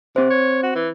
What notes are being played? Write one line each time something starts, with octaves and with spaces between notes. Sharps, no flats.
C3 C4 C5
C#5
F#4
E3